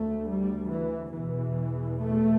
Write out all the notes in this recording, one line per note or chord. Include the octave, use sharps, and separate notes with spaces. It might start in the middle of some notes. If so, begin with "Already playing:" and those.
Already playing: D2 A3
G3
E3
E2 B2 E3
A3